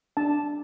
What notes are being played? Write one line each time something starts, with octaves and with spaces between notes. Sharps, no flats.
D4 A5